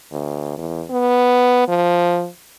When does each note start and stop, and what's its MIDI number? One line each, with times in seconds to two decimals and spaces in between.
0.12 0.53 38
0.58 0.83 40
0.90 1.65 59
1.68 2.28 53